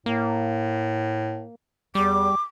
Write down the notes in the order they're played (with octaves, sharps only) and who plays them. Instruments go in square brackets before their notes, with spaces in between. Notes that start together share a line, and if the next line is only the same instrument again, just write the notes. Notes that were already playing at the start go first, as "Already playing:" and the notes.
[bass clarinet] A2 [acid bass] A#3
[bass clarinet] E2 [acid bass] G3 [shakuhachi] D6